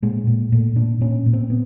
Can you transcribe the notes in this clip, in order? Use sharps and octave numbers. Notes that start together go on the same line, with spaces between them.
A#2 G#3
A#2
A#2 A3
A#2 D4
A#2 C#4
A#2
C4
B3